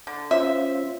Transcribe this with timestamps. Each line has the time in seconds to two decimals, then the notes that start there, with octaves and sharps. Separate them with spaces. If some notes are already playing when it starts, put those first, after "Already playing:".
0.07 D3
0.31 C#4 F4 C5 E5